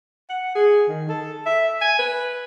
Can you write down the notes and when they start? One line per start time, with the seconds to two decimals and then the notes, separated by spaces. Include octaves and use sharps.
0.29 F#5
0.55 G#4
0.88 D#3
1.09 A4
1.46 E5
1.81 G#5
1.99 B4